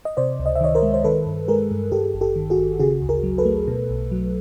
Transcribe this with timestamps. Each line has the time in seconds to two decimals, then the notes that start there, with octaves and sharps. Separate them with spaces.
0.05 D#5
0.17 C3 C5 D5
0.40 C#2
0.46 D#5
0.55 E5
0.61 D#3 C#5 D#5
0.75 A#4 C5
0.83 G#3
0.94 C5
1.04 D#3 A4 B4
1.26 G2
1.48 G#3 G#4 A#4
1.71 G2
1.92 G2 G4 A4
2.14 G#1
2.21 G4 A4
2.36 D#3
2.50 F#4 G#4
2.58 G#1
2.79 C#3 F#4 G#4
3.02 D2
3.09 G#4 A#4
3.23 F#3
3.38 A4 B4
3.45 A3
3.68 B2
3.89 B1
4.11 F#3